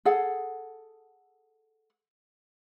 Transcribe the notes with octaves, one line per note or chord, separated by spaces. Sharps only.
G#4 A4 F#5